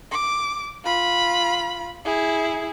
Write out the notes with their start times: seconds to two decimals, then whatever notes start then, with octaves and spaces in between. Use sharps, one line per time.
0.11 D6
0.84 F4 B5
2.05 E4 G#4